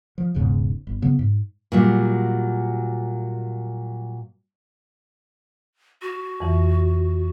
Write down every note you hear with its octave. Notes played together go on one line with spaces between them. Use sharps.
F3
E1 B1 G#2 C#3
G1
C#3 F#3 B3
G#2
A#2 F#3 G3
F#4
F2 E3